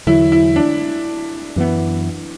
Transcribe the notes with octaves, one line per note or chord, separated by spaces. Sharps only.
E2 D3 F#3 E4
E4
D4
F#2 E3 B3